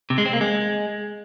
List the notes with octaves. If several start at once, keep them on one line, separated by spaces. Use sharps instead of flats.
C3
G#3
C4
A#3
G#3